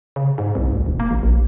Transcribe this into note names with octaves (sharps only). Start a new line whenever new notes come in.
C#3
G#2
C2
D2
E1
A#3
A1
A#1